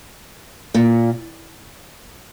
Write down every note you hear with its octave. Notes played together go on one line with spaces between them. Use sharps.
A#2